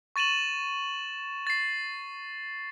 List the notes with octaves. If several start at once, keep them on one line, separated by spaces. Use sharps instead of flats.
C#6 A6 D#7 E7 F#7
A6 C7